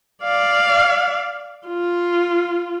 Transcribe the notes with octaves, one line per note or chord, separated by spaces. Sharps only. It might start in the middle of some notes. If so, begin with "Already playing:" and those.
D5 F5
F4